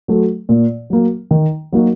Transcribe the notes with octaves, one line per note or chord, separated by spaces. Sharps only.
F#3 A3
A#2
F#3 A#3
D#3
F#3 A#3 D#4 F#4